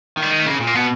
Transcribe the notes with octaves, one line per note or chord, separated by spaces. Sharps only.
D#3
G3
G#3
A3
C#3 A#3
A#2
A#3
B2 B3